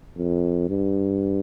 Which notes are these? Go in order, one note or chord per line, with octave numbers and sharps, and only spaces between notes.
F2
G2